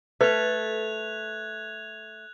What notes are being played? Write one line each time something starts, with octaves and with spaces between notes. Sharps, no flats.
A3 B4 F#6 G#6 F7